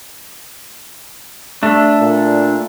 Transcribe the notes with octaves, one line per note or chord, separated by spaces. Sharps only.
A3 D4 A4
A#2